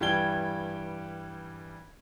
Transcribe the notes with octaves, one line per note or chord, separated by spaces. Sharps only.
G2 E3 G3 G5 G#6 G7